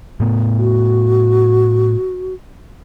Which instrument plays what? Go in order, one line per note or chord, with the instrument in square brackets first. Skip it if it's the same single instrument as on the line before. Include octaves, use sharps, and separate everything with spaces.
[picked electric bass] A2 A3 B3
[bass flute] F#4